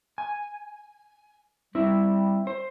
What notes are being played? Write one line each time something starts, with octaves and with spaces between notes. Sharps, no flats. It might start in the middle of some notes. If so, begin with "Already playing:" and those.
G#5
G3 C4 E4
C5